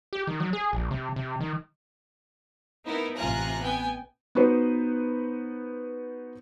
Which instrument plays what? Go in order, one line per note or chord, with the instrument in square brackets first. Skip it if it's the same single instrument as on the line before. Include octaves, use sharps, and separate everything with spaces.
[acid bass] G4
D#3
F#3
G#4
A#1
C3
C3
D#3
[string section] B3 D#4 E4 A#4
A1 C3 F4 G#5 A#5 F#6
B3 G5 G#5
[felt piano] B3 D#4 F#4 B4 C5